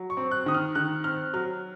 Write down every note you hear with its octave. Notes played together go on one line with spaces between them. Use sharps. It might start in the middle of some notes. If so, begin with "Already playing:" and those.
Already playing: F#3
C#6
C4
F#6
D#3 D#6
F6
D#3 F#6
C4 F6
F#3 F6